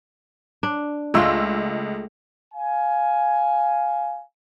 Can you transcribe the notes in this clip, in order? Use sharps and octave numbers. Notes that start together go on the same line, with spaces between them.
D4
C#2 G#3 A3 F4 E6
F5 G#5